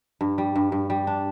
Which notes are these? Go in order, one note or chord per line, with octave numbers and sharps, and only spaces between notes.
G2
G3
G2
G2
G3
D4